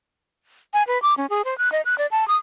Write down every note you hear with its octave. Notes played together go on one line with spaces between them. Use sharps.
G#5
B4
D6
C#4
G#4
C5
F#6
D#5
F#6
D5
A5
D#6